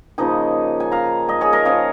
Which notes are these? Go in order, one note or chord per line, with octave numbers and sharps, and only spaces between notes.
C#3 F3 A#3 D#4 D#5 G#5
G#5
F5 A#5
D#5 G#5
G#4 C#5
A#4 D#5
F3 C#4 C#5 F5